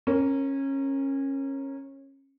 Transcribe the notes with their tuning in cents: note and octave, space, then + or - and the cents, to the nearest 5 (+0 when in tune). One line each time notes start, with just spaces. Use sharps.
C#4 -25 A#4 +0